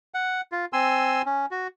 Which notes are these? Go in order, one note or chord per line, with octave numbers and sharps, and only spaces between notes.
F#5
F4
C4 G#5 C6 E6
C#4
F#4